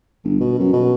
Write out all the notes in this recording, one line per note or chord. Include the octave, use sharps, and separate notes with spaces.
G1
B2
F#2
B2